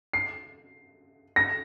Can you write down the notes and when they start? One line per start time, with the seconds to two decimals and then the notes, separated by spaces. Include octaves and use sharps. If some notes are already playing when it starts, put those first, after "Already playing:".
0.13 C7
1.36 A#6